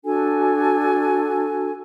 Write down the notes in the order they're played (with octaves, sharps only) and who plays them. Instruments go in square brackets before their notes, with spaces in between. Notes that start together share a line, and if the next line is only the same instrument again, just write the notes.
[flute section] D4 F#4 A4 G#5